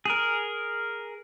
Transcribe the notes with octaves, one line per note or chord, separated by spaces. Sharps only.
G#4 A#4